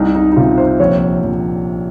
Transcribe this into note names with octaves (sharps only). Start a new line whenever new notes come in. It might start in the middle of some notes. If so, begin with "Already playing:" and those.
Already playing: C2 D#4
D#4
D#4
C3 F4
C5
A#1 C#5
A#1